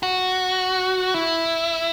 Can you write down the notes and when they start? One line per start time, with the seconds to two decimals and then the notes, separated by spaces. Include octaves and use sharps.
0.03 F#4
1.14 E4